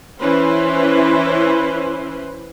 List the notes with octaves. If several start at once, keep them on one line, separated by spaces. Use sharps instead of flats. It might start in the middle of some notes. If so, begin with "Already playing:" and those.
E3 C#4 E4 B4 C5